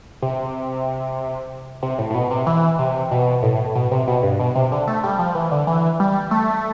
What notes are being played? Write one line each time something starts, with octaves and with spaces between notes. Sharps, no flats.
C3
C3
A2
A2
B2
C3
E3
C3
B2
A2
B2
C3
B2
G2
B2
C3
D3
A3
G3
F3
E3
D3
E3
G3
A3